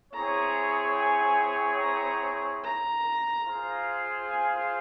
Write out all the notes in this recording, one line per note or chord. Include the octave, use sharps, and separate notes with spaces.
C4 E4 G#4 C#5 A#5
G#5
A#5
A#5
F4 G#4 C5 F5
G#5